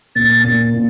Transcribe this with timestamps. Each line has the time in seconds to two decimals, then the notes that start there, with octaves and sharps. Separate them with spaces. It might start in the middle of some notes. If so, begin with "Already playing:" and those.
0.16 A#2 A6
0.44 A#2
0.74 A#2